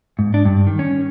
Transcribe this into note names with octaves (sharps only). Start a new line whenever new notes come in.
G#2
D4
G2
D#3
C#4